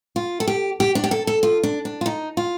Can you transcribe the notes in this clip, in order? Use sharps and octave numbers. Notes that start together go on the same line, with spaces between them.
F4
A4
G4
G4
D4
G4
A4
A4
F4
D4
D4
F4
D#4
F4